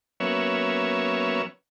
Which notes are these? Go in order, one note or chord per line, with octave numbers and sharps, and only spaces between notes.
F#3 A#3 B3 C#4 C#5 E5